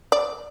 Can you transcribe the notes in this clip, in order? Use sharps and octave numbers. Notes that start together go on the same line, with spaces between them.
D5